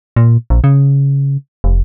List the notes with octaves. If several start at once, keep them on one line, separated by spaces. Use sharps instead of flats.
A#2
A#1
C#3
F1